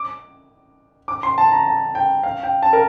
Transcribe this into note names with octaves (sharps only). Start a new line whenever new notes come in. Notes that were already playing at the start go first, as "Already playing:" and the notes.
Already playing: D6
D6
C6
A5
A#5
A5
G5
F5
G5
A5
A#4